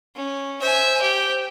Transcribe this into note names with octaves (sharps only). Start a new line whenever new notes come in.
C#4
C5 E5 G#5
G4